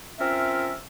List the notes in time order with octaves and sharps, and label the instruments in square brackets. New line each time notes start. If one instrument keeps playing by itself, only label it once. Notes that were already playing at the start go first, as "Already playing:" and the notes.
[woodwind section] C4 C#4 F4 A#4 E5